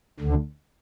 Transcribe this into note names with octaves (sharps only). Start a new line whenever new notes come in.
D2 D3